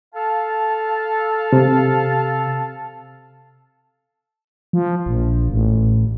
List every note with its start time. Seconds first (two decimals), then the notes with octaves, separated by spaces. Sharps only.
0.13 A4 F5 A5
1.53 C3
4.73 F3
5.06 A#1
5.50 A1